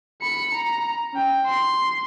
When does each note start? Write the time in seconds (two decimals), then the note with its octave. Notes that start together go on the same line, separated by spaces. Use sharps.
0.22 B5 C#7
0.54 A#5
1.13 C#4 G5
1.46 C6